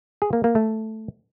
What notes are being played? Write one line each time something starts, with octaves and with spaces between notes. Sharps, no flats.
G#4
A#3
A#3
A3